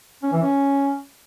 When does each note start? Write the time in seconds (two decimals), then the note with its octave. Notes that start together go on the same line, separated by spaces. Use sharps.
0.23 C#4
0.32 E3
0.42 C#4